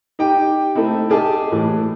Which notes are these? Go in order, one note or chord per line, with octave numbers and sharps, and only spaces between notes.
D#4 G4 G5
A3 C4 D#4 E4
G4 G#4 D#5 A5
A2 E3